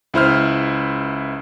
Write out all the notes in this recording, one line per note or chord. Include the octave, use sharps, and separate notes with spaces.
C#2 E4 C5 F6